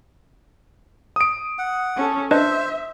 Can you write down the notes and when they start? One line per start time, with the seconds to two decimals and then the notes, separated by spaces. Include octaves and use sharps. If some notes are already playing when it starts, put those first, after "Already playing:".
1.16 D#6 D7
1.59 F#5
1.97 C#4 A4
2.31 D4 B4 C5 D#5 E5